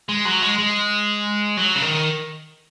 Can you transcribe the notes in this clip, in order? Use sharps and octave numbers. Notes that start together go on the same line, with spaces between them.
G#3
F#3
G#3
G#3
F#3
C#3
D#3